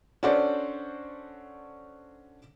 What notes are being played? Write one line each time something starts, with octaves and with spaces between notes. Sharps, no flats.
C#4 D4 F#4 A4 C5 D5